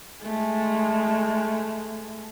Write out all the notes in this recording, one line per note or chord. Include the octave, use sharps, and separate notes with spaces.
G#3 A3